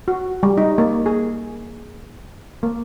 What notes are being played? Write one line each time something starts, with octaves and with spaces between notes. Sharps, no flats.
F#4
G3
D#4
A#3
G#4
A#3